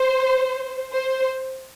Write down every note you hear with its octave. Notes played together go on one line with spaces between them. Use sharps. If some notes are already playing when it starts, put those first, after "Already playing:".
Already playing: C5
C5